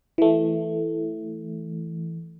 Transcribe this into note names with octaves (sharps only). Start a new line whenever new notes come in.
E3 A3